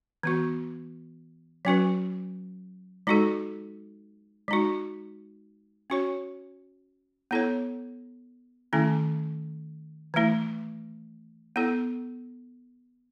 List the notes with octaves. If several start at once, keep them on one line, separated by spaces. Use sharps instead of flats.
E3 B3 F#4
F#3 C#4 F#4 B4
G#3 D#4 F#4 A4
G#3 D#4 F#4
C#4 F#4 C#5
B3 E4 A4 C#5
D#3 A3 C#4 E4
E3 A3 E4
B3 E4 A4